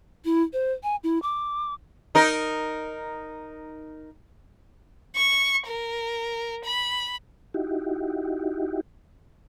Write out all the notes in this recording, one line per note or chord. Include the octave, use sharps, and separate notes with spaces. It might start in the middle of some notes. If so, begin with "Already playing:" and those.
E4
C5
G#5
E4
D6
D#4 A#4
C#6
A#4
B5
D#4 E4 F#4 G4